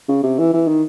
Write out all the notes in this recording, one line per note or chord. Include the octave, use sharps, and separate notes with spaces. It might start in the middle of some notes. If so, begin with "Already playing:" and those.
C#3
C3
E3
E3
D#3